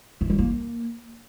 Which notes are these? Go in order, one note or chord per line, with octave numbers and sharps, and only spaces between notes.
E3
G3
A#3